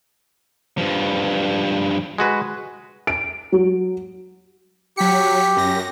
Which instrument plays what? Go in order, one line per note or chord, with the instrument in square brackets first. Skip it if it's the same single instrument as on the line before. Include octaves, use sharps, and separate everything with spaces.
[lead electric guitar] G2 F3
[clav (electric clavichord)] G#3 F#4 B4
[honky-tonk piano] D7
F#3
[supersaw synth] F#3 B6 C#7 [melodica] G4
[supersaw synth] F#2 A#6